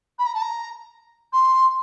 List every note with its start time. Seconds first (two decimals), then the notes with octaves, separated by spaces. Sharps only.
0.18 B5
0.26 A#5
0.34 A5
0.41 A#5
1.32 C6